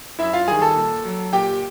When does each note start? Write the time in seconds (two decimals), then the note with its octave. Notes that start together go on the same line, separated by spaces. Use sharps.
0.19 F#2 E4 E5
0.33 F4 F5
0.48 D#3 G3 G#4 G#5
0.62 A4 A5
0.76 A#2
1.05 F#3
1.33 A#2 G4 G5